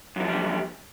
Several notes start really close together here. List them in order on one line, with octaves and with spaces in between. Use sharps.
F#2 E3 F3 G3 D3